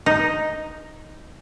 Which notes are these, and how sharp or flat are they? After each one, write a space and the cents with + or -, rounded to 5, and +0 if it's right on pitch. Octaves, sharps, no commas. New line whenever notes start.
D#4 +0